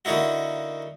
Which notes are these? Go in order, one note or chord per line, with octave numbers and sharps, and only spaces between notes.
D3 A#3 D#4 E4 F#4